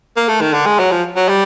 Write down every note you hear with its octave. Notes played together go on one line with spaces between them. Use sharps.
A#3
A3
D#3
D3
G#3
F#3
F3
F#3
G3